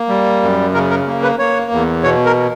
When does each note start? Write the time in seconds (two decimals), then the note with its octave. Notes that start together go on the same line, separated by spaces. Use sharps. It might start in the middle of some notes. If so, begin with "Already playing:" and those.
Already playing: A#3
0.09 G3
0.42 F#2
0.74 C#3 A#4
0.90 A#4
1.07 A#3
1.23 B4
1.39 A#3 C#5
1.71 E2
2.03 B2 C#5
2.26 A#4